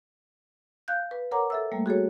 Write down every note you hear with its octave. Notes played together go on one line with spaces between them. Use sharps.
F5 F#6 G6
B4
A#4 C#5 F#5 A#5 D6
A4 E5 E6
G3 A3 A#3
F#4 G#4 A4 C#5